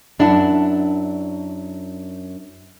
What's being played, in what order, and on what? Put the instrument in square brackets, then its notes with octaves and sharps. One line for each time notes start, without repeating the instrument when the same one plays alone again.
[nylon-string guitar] F#2 D4 E4 F#5 A5